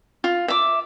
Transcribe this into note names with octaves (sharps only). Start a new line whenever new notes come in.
F4
E5 D6